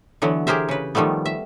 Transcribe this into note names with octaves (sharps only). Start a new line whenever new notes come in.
D3 E3 F#3 B3
G4 G#4 A#4 C5 E5
C#3 B4
D#3 F3 G3 A3 B3
E5